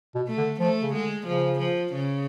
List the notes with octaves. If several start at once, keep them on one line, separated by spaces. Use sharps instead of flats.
B2
A3
D3
F3 A3
C#3
D3 G#3
C#3 F3
F3
C#3